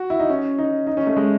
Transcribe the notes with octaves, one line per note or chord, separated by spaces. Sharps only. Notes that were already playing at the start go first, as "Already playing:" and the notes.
Already playing: F#4
E4
D#4
C#4
D#4
D#4
C#4
A3
G#3